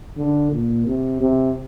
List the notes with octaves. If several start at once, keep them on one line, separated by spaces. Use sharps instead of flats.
D3
A#2
C3
C3